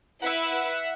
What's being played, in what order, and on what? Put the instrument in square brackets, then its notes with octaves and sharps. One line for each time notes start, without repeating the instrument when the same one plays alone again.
[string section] E4 B4 [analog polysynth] E5 F#5